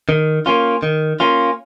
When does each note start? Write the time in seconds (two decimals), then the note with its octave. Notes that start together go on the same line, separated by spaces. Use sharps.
0.09 D#3
0.46 A#3 C#4 F4
0.83 D#3
1.20 A#3 C#4 F4